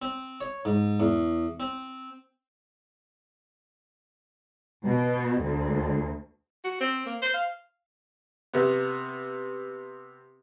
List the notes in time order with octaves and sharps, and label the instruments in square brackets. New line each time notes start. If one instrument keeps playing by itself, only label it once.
[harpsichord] C4
C#5
G#2
E2
C4
[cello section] B2
D2
[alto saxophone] F#4
C4
A#3
C5
F5
[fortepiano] C3 B3